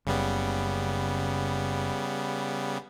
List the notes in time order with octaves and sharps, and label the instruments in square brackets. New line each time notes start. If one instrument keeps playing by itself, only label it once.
[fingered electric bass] F#1 [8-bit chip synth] C#3 G3 B3